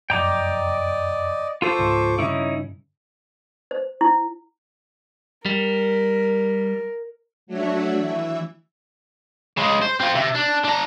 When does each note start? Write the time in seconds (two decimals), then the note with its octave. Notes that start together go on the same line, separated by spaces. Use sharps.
0.10 F1 F#2 D5 D#5 G5 A#5 D6
1.62 F4 A4 C5 C#6 D6
1.79 C#2 G#2
2.19 G2 C#3 C#4 D#4 E4
3.71 C5
4.01 E4
5.46 G3 A#4
7.47 F#3 A3 D4 F#4 C#5 E5
7.96 E3 E5
9.57 C#3 G#3
9.82 C5
10.00 C4 F4
10.15 C3
10.35 D4
10.64 D4 A#5